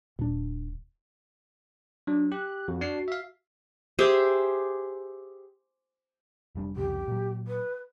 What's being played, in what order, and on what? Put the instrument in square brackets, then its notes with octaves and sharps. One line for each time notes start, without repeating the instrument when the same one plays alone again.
[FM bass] D#1 [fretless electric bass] A#2 D4
[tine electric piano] F#3 [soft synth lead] D4
[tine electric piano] G4 [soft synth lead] F#6
[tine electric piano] F2 [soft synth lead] F#4
[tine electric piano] D4 A5 C7
E5 F5
[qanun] G4 G#4 C5 E5
[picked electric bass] F1 G3 D4
[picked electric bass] C2 F2 C#3 [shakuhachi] G4
[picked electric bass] A#2 F#3
[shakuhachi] B4